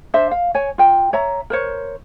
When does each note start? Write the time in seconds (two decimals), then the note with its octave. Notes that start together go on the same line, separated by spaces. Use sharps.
0.14 D4 C5 E5
0.31 F5
0.54 C#5 G#5
0.78 F4 G5
1.13 C#5 E5 A#5
1.50 A#4 C5 C#5